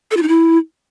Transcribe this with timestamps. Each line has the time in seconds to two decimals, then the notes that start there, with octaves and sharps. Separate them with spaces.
0.11 A4
0.17 F4
0.22 D#4
0.28 E4